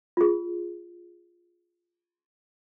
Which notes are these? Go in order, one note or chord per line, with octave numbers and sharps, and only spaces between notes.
F4 G#4